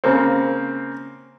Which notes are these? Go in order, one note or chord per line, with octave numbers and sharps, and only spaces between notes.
C#3 A#3 C4